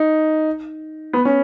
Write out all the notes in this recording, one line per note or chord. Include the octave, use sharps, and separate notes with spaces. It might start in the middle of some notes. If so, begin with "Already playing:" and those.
Already playing: D#4
B3
C#4